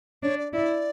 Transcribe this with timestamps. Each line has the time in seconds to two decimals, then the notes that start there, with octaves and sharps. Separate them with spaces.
0.23 D4 C#5
0.38 D5
0.53 E4 D5